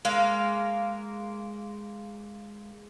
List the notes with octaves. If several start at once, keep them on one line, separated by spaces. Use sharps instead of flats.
G#3 A#3 F5